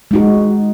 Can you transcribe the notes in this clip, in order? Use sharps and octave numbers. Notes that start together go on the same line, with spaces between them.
G#3 D#4 F#4